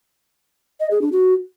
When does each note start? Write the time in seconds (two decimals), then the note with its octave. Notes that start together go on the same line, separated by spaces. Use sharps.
0.80 D#5
0.91 G#4
1.02 D4
1.12 F#4